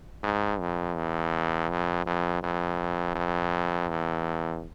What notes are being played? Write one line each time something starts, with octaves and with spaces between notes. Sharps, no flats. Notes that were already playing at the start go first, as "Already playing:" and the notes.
G#2
F2
E2
F2
F2
F2
F2
E2